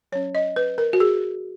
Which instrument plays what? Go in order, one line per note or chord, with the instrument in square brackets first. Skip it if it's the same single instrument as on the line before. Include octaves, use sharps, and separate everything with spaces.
[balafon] F#3 C#4 C#5
D#5
B4
A#4
F#4
G#4